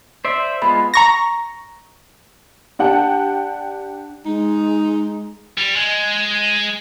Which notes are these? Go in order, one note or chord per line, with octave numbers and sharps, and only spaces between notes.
C5 D5 E5
G#3 B3 F4 B5
A#5 C#6 A#6
D4 G4 F#5 G5 A5
G#3 D#4
G3
G#3